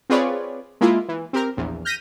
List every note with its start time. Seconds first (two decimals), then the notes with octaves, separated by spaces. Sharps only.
0.10 C4 F4 G#4 B4 C#5 D5
0.81 G#3 A#3 E4 F4
1.08 E3
1.33 C4 G4 A#4
1.57 A#1 E2
1.85 F6 G6 A#6 B6 D#7